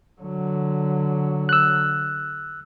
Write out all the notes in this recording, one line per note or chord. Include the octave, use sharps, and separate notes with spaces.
D3 F#3
E6 F#6